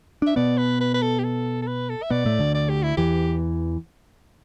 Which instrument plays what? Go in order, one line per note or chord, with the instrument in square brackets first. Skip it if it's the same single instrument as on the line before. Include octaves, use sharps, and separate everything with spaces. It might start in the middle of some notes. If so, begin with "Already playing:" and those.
[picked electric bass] D4 [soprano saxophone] E5
[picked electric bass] B2 B3 [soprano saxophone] D5
[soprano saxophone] B4
B4
B4
A4
G4
A4
A4
B4
A4
E5
[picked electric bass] B2 B3 [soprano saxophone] D5
[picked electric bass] A2 A3
D2 D3
[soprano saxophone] D5
G4
E4
[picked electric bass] E2 E3 [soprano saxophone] G4